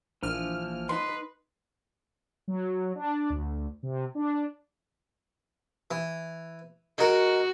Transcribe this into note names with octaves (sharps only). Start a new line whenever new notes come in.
A#1 E3 F3 F6
D#4 B4 C6
F#3
D4
D2
C3
D4
E3
G#3 F#4 A#4